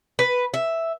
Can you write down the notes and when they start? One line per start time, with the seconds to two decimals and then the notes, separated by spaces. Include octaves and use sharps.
0.19 B4
0.54 E5